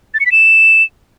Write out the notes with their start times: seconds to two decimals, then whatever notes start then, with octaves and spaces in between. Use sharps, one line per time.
0.14 A6
0.20 C#7
0.26 B6
0.32 E7